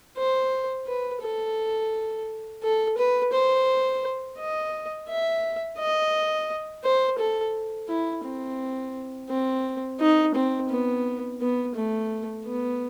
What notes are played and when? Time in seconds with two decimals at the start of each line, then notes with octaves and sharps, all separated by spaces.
0.17 C5
0.87 B4
1.22 A4
2.63 A4
2.98 B4
3.33 C5
4.38 D#5
5.09 E5
5.79 D#5
6.84 C5
7.18 A4
7.89 E4
8.25 C4
9.29 C4
10.00 D#4
10.35 C4
10.70 B3
11.40 B3
11.76 A3
12.46 B3